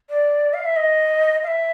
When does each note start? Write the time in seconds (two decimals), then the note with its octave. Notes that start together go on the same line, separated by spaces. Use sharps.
0.10 D5
0.53 F5
0.65 E5
0.76 D#5
1.43 F5
1.47 E5